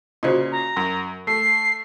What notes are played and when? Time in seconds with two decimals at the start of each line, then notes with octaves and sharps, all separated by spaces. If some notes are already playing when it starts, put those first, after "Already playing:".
0.23 A#2 C#3 F#4 C5 D#5
0.52 A#5
0.77 F#2
1.27 A3 C7